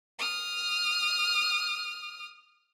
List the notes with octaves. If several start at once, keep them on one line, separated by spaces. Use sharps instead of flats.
D#6 F6